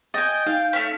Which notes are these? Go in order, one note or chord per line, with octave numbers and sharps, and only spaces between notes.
D#5 G5 G#5 A6
D#4 F5
A3 C#4